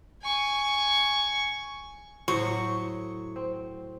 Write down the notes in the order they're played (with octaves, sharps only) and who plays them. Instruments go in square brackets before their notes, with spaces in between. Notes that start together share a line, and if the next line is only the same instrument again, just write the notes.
[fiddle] G#5 C#6
[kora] A2 C5 [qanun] F#3 [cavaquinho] C#6
[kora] C4